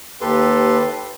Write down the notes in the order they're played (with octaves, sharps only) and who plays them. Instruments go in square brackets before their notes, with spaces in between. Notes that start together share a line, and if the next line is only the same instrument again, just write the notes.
[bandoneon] D#2 G4 A4 B4 C6